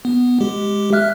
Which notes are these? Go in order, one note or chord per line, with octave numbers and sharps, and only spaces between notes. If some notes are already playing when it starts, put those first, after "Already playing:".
B3
G#3 G4
E5 F6 F#6